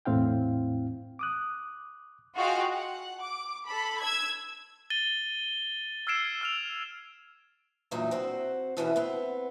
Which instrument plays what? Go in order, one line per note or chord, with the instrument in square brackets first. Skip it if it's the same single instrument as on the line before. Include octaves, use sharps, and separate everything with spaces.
[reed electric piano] E2 A2 C4 E4 F5 G5
D6 D#6 F#6
[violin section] F4 F#4 G#4 D#5 F5 G5
F#5
D6
A4 B5
E6 G#6
[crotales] A6 D#7 G7
E6 F6 G#6 C7 D7 E7
E6 F6 F7
[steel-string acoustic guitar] E2 G2 A#2 F#3 D#4
C4 F#4 C5
F2 B2 E3 C#4 F#4 B4
B3 C4